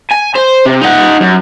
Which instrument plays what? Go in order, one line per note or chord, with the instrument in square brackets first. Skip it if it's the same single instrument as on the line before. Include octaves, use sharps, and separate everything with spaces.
[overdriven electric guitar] G#5
C5
C3
D#4 F#5
F#2